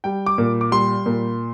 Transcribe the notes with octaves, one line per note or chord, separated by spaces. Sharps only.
G3 G5
D6
A#2
D6
G3 C6
A#2